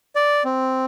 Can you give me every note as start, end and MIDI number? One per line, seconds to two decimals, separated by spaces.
0.16 0.43 74
0.45 0.86 60